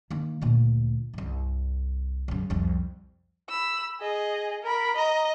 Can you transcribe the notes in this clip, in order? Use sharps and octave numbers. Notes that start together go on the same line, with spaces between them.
D#3 A#3
D2 A#2
C2 G2
F#2 C#3
C2 F2
B5 E6
G#4 D#5
A#4 B5
D#5 A#5